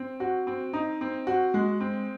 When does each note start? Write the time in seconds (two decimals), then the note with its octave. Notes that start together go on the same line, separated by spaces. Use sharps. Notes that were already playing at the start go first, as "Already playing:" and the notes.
Already playing: C4
0.20 F#4
0.47 C4
0.73 D#4
1.01 C4
1.27 F#4
1.54 G#3
1.80 C4